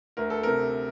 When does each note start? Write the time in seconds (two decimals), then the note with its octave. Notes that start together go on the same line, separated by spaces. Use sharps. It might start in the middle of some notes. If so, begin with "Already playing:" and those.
0.17 D2 A#4
0.30 A4
0.43 C3 A#4